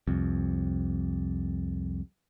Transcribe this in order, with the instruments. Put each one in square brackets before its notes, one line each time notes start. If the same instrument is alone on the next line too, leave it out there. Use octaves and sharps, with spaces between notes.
[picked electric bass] C2 F2